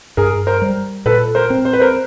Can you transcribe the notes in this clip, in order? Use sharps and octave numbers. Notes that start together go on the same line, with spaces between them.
G2 G#4 A#4
A#4 C5
G3
A#2 A4 B4
A#4 C5
C4
C5
B4
A#4 C5